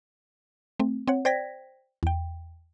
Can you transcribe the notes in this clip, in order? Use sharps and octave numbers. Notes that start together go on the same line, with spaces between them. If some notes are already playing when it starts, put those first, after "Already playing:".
A3 C4
C4 C#5 F#5
C5 D5 G5 G#6 A#6 B6
E2 G5